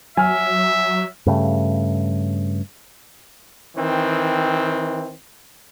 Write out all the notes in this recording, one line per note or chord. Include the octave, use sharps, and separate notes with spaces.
F#3 E5 G#5 F6
G2 C#3 A3
D#3 E3 C4